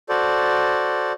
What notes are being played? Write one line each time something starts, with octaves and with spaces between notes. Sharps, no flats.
F#4 A4 C5 D5